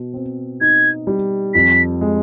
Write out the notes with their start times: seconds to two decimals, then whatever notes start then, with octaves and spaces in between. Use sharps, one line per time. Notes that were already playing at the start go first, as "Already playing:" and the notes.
Already playing: B2
0.14 C4
0.61 D#4 G#6
1.07 G3
1.54 F2 B6
2.01 G#3